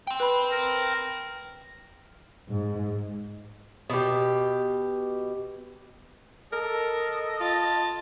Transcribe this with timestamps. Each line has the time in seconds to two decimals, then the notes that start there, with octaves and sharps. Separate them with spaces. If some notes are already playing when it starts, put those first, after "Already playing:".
0.07 G5 C6
0.20 B4 B5
0.51 A#4
2.50 G#2
3.90 B2 G4
6.53 A4 A#4 D#5
7.40 F4 A5